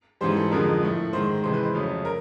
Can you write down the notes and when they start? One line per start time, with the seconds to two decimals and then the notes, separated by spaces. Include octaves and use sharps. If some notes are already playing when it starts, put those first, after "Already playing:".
0.21 G#2 E3 G3 C5
0.36 A4
0.52 F2 D3 F3 G#3 A#4
0.82 A2 F3 A3
1.13 G#2 D#3 G#3 C5
1.44 C3 E3 G#3 C5
1.53 B4
1.63 C5
1.75 F2 C#3 F#3 A3
2.05 A#4